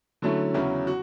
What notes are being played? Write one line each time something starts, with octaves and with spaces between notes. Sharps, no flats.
D3 F#3 A3 C#4 E4
E2 C#3 F#3 C#4 E4
F#4